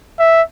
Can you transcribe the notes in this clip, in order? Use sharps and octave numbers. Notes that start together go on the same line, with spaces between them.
E5